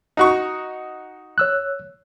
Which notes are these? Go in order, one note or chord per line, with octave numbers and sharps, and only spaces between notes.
D#4 F#4 C#6
C#5 E6 F#6